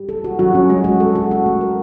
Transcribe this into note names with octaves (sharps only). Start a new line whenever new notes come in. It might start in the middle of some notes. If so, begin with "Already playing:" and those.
Already playing: G3
A4
F#4
F#3 F#4
C#4
G#3 F#4
F#4
A4
F#4
F#4
A3
A#4